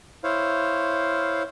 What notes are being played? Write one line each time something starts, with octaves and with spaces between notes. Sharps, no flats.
E4 C5 C#5 F5